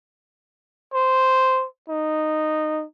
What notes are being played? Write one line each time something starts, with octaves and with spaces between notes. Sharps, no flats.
C5
D#4